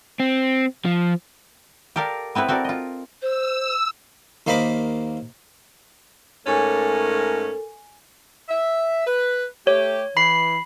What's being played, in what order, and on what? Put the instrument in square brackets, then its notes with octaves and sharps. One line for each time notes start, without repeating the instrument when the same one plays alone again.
[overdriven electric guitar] C4
F3
[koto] G4 A4 A#4 D5 F5
B3 C4 E4 B4 C#5
C4 F#4 A4 A#4 D5
F4 D#5
[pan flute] C5 [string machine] E6
[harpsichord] D#2 A#3 C5 D#5 B5 D6
[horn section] G#2 A3 C#4 [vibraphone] A4 [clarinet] A#4 [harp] G#5 C#6 D6
[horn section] E5
B4
[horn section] A3 G4 [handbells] C#5
[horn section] E3 [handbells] B5 C7